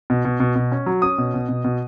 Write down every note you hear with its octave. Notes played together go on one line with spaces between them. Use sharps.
B2
B2
B2
B2
C#4
F#3
C#4 D#6
B2
B2
B2
B2